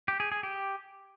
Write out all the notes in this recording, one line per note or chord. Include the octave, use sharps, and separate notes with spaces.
G4
G#4
G#4
G4